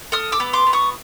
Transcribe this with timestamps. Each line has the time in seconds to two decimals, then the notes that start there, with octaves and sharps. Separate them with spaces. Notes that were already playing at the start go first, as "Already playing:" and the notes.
0.12 A4 D#6 F6
0.32 D6 E6
0.40 B3
0.53 C6 D6
0.67 B3
0.73 C#6 D#6